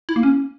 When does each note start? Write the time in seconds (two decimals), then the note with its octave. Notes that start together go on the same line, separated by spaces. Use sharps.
0.09 E4
0.16 A#3
0.23 C#4